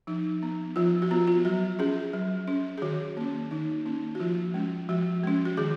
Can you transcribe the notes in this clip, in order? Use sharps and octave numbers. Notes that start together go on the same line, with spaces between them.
F3 D#4
B3
F3 F4
F#4
B3 F4
F4
F#3 F#4
C#4 G#4
F#3
C#4
G#4
D#3 F#4
A#3 C#4
D#3 D#4
A#3 C#4
F#4
F3 F4
G#3 C#4
F3 F#4
G#3 C#4
F#4
D#3 G#4